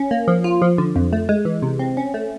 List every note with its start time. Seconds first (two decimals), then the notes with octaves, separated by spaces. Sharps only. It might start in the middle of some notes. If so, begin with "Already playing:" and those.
Already playing: C#4
0.11 A#3
0.28 F3
0.44 F4
0.62 F3
0.78 D3
0.96 F2
1.13 A3
1.29 G#3
1.45 E3
1.62 C3
1.79 C4
1.97 C#4
2.14 A3